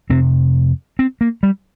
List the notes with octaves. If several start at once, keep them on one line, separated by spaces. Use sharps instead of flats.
F2 C3 C4
C4
A#3
G3